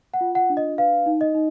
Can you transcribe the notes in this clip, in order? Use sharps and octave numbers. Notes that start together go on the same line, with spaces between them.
F#5
F4
F#5
D4
D#5
B4 F5
D#4
D#5
D#4